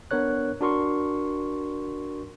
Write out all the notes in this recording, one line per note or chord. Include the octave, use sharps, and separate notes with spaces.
B3 D4 A#4 C#5 F#6
D4 F#4 A#4 C6 C#6